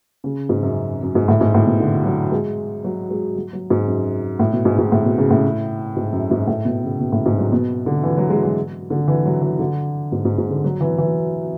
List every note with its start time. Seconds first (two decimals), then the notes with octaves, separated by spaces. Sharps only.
0.24 C#3
0.49 G#2
0.63 F#2
1.02 F#2
1.15 G#2
1.28 A2
1.41 G#2
1.54 A2
1.66 B2
1.80 D3
2.05 F#3
2.32 G#3
2.84 F#3
3.10 G#3
3.36 F#3
3.53 F#3
3.70 G#2
3.88 F#2
4.39 A2
4.53 B2
4.65 G#2
4.78 G#2
4.92 A2
5.05 B2
5.18 C#3
5.30 A2
5.96 G#2
6.13 F#2
6.31 G#2
6.47 A2
6.65 B2
6.83 C#3
7.00 B2
7.12 A2
7.26 G#2
7.39 F#3
7.52 B2
7.86 D3
8.03 E3
8.17 F#3
8.30 G#3
8.43 F#3
8.90 D3
9.08 E3
9.25 F#3
9.42 E3
9.59 D3
10.12 G#2
10.25 G#2
10.38 G#2
10.50 D3
10.64 F#3
10.81 E3
10.98 E3